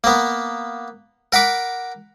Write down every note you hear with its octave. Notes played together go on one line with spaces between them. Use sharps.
A#3 B3
A#4 F#5 B5 D6